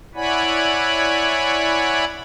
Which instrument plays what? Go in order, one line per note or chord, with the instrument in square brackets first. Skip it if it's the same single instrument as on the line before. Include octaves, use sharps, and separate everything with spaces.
[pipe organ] E4 C#5 D5 F#5 G#5 B5